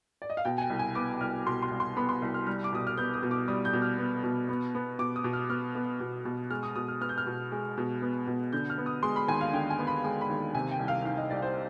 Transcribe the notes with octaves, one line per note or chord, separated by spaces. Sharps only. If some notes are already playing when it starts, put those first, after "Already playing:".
D5
D#5
F5
B2 G5
G#5
G5
C2
G#5
B3 D6
C2 F6
B2 C6
C6
C2
C6
B3 B5
C6
C2
F6
G3 F6
D6
B2 D#6
F6
B3 G6
D#6
B2
D6
G3 D#6
G6
B2
F6
B3
B2
B3
B3
B2 D6
D#6
B2
F6
B3 F6
B3
B2
B2
G#3 F6
D#6
B2 D#6
F6
B3 F6
G6
F6
B2
G#3
B2
B3
B2
D3 G6
F6
B3
D#6
G#3 C6
B5
D#2 G#5
F5
D3 G5
G#5
B3
B5
G#3 G#5
B5
D#2
C3 G#5
G5
C2
F5
D#3 F5
D#5
C2 D5
C5